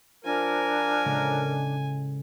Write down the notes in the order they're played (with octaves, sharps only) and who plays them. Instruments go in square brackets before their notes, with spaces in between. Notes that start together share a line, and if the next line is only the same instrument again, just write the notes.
[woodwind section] F3 A#4 [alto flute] D4 [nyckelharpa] G#5
[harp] A2 C#3 G#3